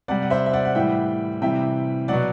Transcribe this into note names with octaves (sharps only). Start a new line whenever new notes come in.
C3 G3 D5 F#5
F#5
C5 E5
E5
D5 F#5
F#5
A2 E3 G3 E5 G5
C3 E3 G3 E5 G5
B2 F#3 D5 F#5